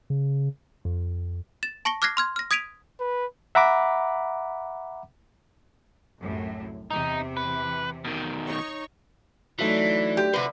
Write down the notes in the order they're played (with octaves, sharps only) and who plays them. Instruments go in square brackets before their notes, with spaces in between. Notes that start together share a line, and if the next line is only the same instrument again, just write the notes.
[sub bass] C#3
[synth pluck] F2
[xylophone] A6 E7
A5 C#6 A#6 C#7 G7
D6 F6 F#6 G#6 A#6 C7
C6 F6 G#6
F6 A#6
D#6 G#6 B6 D7 D#7 F7
[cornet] B4
[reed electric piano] E5 F#5 A#5 B5 D6
[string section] C2 F#2 A2
[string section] E2 C3 E3 [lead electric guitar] D#4
[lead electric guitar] B4
B2 D#3
[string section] D#4 C#5 C#6
[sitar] D3 [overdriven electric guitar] E3 [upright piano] F#3 A3 D#4
[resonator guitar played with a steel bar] G4
[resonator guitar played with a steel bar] C3 B4 [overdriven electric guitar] F3 F#4